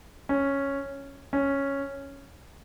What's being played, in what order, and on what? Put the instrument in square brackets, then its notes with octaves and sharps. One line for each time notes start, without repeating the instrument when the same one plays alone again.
[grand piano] C#4
C#4